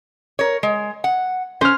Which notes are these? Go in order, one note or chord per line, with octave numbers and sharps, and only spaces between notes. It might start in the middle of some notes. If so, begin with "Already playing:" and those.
A#4 C#5
G#3
F#5
C#4 C5 F6